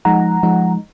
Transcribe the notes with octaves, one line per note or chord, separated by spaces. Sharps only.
F3 G#3 D#4 F#5 A#5
F3 G#3 D#4